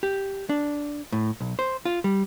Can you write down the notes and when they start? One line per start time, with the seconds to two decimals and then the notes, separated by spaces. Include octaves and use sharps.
0.03 G4
0.49 D4
1.12 A2
1.40 B1
1.59 C5
1.85 F4
2.04 G3